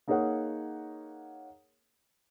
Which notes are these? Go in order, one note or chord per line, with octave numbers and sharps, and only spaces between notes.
A#3 D#4 G#4 A#4 C#5 F#5